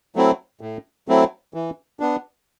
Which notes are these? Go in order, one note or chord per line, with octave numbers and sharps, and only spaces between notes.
F#3 A3 C4 E4
A2
F#3 A3 C4 E4
E3
B3 D4